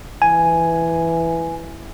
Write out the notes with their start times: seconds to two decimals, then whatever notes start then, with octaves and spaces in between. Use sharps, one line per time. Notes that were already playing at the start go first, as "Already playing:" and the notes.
0.22 E3 G#5